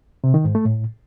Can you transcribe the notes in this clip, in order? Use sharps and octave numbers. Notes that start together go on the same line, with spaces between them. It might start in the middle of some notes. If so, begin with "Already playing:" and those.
C3
D#3
G#2
A3
A2